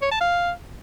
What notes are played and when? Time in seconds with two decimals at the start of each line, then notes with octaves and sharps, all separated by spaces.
0.02 C#5
0.11 A5
0.21 F5